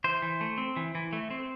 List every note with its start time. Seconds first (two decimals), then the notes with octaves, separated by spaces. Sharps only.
0.04 E3 C5
0.22 E3
0.41 A3
0.58 C4
0.76 E3
0.95 E3
1.13 A3
1.31 C4